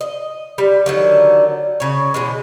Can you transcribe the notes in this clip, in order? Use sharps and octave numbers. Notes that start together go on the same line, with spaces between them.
D#5
G3
D3 D#3 F#3
C#3 C#5
B2 E3 G#3